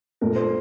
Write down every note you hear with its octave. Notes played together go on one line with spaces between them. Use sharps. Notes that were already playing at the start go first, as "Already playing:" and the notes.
A#2 A3 A#4
C5